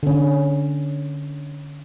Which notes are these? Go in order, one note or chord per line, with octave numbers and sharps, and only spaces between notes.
D3 C#4